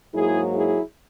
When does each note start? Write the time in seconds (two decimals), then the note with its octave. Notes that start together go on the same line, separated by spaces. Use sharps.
0.14 G#2 F#3 A#3 E4 G#4
0.53 E4 G#4